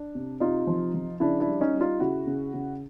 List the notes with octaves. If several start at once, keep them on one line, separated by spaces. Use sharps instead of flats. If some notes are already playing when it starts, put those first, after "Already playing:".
Already playing: D4
C3
C3 D#4 F4
F3
F3
C#3 D4 E4
D4 E4
G3
C#4 D#4
G3
D#4 F4
C#3 E4 F#4
C#3
C#3